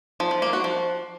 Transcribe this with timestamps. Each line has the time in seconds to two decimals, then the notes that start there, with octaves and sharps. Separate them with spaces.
0.20 F3
0.31 F3
0.42 A#3
0.53 F#4
0.64 F3